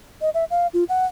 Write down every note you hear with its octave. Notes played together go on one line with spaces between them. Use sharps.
D#5
E5
F5
F4
F#5